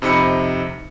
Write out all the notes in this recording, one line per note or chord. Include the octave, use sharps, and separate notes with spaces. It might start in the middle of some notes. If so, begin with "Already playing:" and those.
F2 C3 D#4 B5 C#7